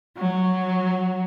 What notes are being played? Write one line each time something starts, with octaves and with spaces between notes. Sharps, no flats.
F#3